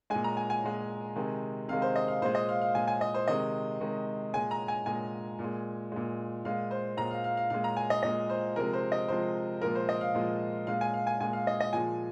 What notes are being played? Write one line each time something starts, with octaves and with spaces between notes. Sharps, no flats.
A#2 G#3 G#5
A#5
G#5
G#5
A#2 G#3
C3 D#3 G#3
C3 D#3 G#3 F5
C5
D#5
F5
A#2 G#3 C5
D#5
F5
F5
A#2 G#3 G#5
G#5
D#5
C5
C3 D#3 G#3 D#5
C3 D#3 G#3
A#2 G#3 G#5
A#5
G#5
A#2 G#3 G#5
A#2
G#3
A#2 G#3
A#2 G#3 F5
C5
A#2 G#3 A#5
F5
F5
F5
A#2 G#3 F5
A#5
G#5
D#5
A#2 G#3 D#5
C5
C3 F3 G#3 A#4
C5
D#5
C3 F3 G#3 C5
A#2 F3 G#3 A#4
C5
D#5
F5
A#2 F3 G#3
A#2 G#3 F5
G#5
F5
G#5
A#2 G#3 G#5
F5
D#5
D#5
A#2 F3 G#3 G#5